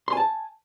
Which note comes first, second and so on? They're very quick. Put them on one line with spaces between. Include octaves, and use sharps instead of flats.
C6 G#5 A5